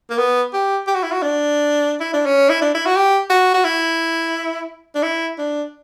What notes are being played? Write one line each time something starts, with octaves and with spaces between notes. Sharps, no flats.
A#3
B3
G4
G4
F#4
E4
F#4
D4
E4
D4
C#4
E4
D4
E4
F#4
G4
F#4
F#4
E4
D4
E4
D4